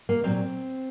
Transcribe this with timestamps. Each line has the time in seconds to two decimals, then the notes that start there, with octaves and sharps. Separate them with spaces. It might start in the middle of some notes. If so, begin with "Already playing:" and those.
0.09 A#3
0.24 A#2 F#3 C4